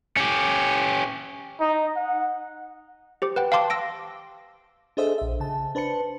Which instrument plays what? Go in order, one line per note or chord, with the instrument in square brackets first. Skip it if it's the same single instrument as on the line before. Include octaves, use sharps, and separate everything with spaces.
[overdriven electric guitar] C#4 G4
[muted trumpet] D#4
F#5
[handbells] G4 C5 D6
B4 F#5 G5
F5 G5 A5 C6 D6
E6 A#6 D7
[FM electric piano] D4 G#4 A4 C5 D#5 E5
A#1 E5
C#3 A5
D4 B4 C5 A5 C#7